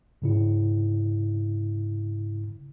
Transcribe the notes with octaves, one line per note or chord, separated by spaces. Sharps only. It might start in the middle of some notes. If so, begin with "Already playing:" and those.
G#2 C#3 E4